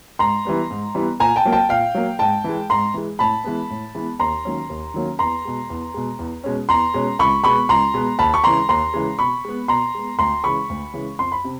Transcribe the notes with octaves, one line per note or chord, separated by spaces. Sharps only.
G#2 A#5 C6
E3 G3 B3
G#2
E3 G3 B3
A#2 G#5 A#5
G5 A5
F#3 A#3
G5 A5
A#2 F5 G5
F#3 A#3
G#2 G5 A5
E3 G#3
G#2 A#5 C6
E3 G#3
A2 A5 B5
E3 G#3 B3
A2
E3 G#3 B3
D#2 A#5 C6
D#3 F#3 A#3 C#4
D#2
D#3 F#3 A#3 C#4
E2 A#5 C6
B2 G#3
E2
B2 G#3
E2
B2 G#3 C#4
E2 A#5 C6
B2 G#3 C#4
C#2 B5 C#6
B2 G#3 B3 B5 C#6
C#2 A#5 C6
B2 G#3 B3
D#2 A5 B5
C#6
C#3 E3 G#3 A#5 C6
D#2 A#5 C6
C#3 E3 G#3
B2 B5 C#6
G#3 B3
B2 A#5 C6
G#3 B3
D2 A#5 C6
C#3 E3 G#3 B5 C#6
D2
C#3 E3 G#3
F2 C6
B5
C3